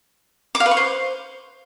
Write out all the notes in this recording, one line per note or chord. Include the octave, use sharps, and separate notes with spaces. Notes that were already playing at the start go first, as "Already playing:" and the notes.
D6
F5
B4
C#6
C5